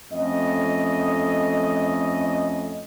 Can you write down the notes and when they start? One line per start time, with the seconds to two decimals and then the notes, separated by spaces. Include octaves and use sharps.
0.13 F2 A3 C#4 D#5